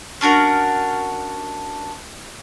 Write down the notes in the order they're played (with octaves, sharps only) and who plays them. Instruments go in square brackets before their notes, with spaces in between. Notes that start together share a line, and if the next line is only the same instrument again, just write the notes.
[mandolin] C#4 D4 F#4 A#4